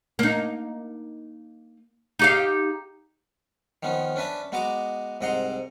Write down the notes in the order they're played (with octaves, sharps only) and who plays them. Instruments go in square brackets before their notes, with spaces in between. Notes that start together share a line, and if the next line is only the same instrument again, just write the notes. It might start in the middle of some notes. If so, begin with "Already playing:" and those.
[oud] A#3 D#4
D#4 G4 F5
[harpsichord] D#3 F3 B3 C#4
C#4 D4 B4 E5 A5
G#3 B3 F#4 D#5 A#5 D6
C2 G#2 D#5 F#5 A#5 C6